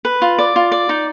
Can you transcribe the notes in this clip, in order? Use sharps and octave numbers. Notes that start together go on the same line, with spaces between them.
B4
F4
D5
F4
D5
D#4